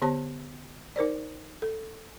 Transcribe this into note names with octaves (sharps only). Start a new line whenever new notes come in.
D3 B3 G4 C5 C#5 A5
D#4 A#4 C5 D5
A4